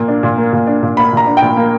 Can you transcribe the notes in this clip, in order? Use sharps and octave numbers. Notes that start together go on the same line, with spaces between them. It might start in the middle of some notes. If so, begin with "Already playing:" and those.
Already playing: A#2 A#3
D4
A#2
A#3
A#2
D4
A#2
A#3 B5
A#2 A#5
D4
G5
A#2
A#3